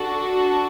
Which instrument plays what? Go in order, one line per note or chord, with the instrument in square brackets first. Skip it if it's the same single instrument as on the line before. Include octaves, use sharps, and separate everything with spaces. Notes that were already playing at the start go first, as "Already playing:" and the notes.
Already playing: [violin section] D4 F#4 A4